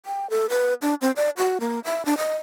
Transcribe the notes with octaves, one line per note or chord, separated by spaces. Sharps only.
G5
A4
B4
D4
C4
D5
F#4
A#3
E5
D4
D#5